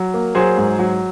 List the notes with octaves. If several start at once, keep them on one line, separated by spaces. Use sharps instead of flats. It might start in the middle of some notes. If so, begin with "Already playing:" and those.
Already playing: F#3
A#3
F#3 G#4 C5
G#2
F#3